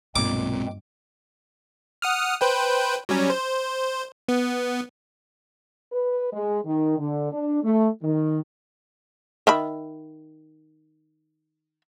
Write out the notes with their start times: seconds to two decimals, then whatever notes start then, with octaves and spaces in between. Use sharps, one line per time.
0.16 B1 G2 A#2 G#3 B3 C4 D6
2.02 F#5 D#6 F6
2.41 B4 C5 G5
3.09 F#3 G3 C#4
3.30 C5
4.28 B3
5.93 B4
6.32 G#3
6.64 D#3
6.97 D3
7.31 D4
7.62 A3
8.01 D#3
9.47 D#3 E5 B5